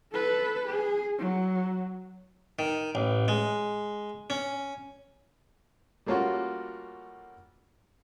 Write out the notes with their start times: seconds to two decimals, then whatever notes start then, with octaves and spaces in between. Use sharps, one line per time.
0.12 A4 B4
0.67 G#4
1.18 F#3
2.59 D#3
2.95 A1
3.28 G#3
4.30 C#4
6.06 G3 A3 A#3 C#4 F4 F#4